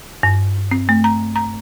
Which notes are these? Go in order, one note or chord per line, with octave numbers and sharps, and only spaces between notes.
G2
C4
A3
A#5
A#5